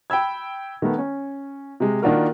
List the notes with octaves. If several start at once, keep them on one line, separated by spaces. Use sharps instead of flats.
G5 B5 E6 G#6
D#3 A3 B3
C#4
C3 G#3
D#3 A#3 D4 F4 F#4 A#4